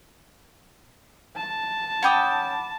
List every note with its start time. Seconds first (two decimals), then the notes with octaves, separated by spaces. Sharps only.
1.37 A5
2.03 C#4 F#5 G5 B5 D6 D#6